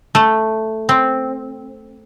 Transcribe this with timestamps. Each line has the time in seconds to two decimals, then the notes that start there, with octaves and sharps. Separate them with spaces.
0.15 A3
0.89 C4